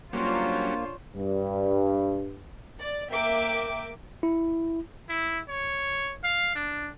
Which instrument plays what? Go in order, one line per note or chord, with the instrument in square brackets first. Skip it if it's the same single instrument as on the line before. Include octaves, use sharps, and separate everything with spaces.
[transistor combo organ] F#3 G3 C#4 [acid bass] A#3 [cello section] D4 F4 [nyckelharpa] C5 C#5
[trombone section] G2
[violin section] D5
A#3 E5 G5 D6
[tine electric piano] E4
[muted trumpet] E4
C#5
F5
D4